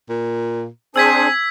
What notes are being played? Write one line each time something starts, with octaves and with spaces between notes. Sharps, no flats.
A#2
C4 D4 G#4 C5 G#5 E6 G#6 B6